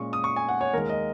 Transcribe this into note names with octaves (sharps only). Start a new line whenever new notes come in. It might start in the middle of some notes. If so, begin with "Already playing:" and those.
Already playing: A#2 G#3 C#4 C#6
D#6
C#6
G#5
F#5
C#5
D#2 D#3 G#3 A#4
D#5